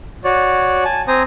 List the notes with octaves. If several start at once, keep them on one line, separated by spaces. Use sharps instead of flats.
F#4 C#5 D5
G#5 A5
C4 C5 G#5 A#5 D#6